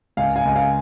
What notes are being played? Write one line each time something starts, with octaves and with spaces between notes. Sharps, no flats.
C#2 F5 G#5
F5 G#5
C#2
F5 G#5